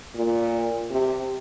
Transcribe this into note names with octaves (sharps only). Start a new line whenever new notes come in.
A#2
C3